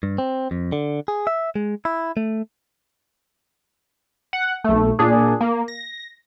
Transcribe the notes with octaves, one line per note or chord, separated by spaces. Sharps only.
G2
C4
F2
D3
G#4
E5
G#3
E4
A3
F#5
B1 A3
A#2 D4 G#4
A#3
A#6